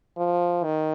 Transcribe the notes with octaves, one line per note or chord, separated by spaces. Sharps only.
F3
D#3